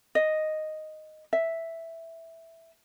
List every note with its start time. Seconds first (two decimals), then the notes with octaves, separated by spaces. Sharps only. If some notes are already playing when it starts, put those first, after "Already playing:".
0.15 D#5
1.33 E5